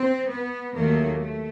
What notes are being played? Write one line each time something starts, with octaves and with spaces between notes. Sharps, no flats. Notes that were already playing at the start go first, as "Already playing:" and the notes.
Already playing: C4
B3
D#2 D#3 F#3 A3 A#3
A3